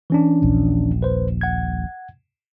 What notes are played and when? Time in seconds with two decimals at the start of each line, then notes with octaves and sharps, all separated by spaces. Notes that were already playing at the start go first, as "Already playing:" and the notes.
0.10 E3 C#4 D4
0.42 D#1 A#1
1.03 B4 C5
1.41 F#5 G#6